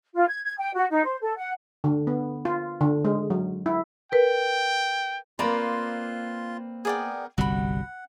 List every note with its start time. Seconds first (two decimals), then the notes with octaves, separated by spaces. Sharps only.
0.15 F4
0.28 G#6
0.44 G#6
0.58 G5
0.74 F#4
0.90 D#4
1.04 C5
1.22 A4
1.37 F#5
1.84 D3
2.07 B3
2.45 F4
2.81 D3
3.05 G#3
3.30 F#3
3.66 E4
4.12 A#4 B4 G5
5.39 A#3 C4 F4 B4 D5 A#5 C6
6.85 B3 G#4 A#4 D5 G5
7.38 G1 C2 G3 F#4 F#5 B5